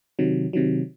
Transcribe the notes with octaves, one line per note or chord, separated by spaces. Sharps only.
C3 D#3 F#3
C3 D#3 F#3